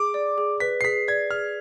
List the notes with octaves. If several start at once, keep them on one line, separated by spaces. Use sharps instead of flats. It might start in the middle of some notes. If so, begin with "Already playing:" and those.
Already playing: G#4 D6
D5
G#4
B4 B6
C7
G#4 B6
D5 G#6
G#4 F6